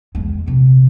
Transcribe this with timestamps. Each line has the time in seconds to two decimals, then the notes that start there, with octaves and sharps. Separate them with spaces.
0.15 E2 G#3
0.46 A#1 C3